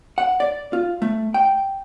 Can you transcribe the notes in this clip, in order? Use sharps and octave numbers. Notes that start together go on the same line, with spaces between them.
F#5
D5
F4
A3
G5